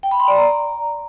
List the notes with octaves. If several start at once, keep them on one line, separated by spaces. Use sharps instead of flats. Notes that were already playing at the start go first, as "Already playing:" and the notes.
G5
B5
C6
D5
A#5